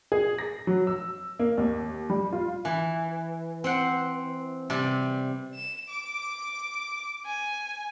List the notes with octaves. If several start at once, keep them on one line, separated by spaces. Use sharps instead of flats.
G#4
A#6
F#3
E6
A#3
D#2
G3
F4
E3
C4 C5 F#5
C3 G3
E7
D6
G#5